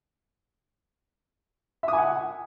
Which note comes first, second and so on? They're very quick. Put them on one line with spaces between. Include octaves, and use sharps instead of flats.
E5 D#6 G#5 F#5